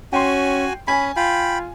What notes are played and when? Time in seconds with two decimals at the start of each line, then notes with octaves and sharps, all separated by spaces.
0.13 C#4 F#4 G5 G#5 C6
0.88 C#4 G#5 B5
1.16 F4 G5 B5